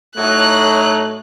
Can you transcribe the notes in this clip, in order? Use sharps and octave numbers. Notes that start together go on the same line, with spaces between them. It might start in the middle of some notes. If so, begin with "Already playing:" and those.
A2 F#3 A3 D#4 F#6